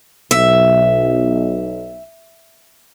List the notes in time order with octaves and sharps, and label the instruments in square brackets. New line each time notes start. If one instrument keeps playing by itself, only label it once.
[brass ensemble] B1 [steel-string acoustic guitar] E5